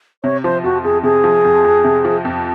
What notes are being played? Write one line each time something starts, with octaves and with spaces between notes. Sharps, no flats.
C3 C#5
F3 C5
F2 F#4
F2 G#4
C3 G#4
F3
F2
F2
C3
F3
F2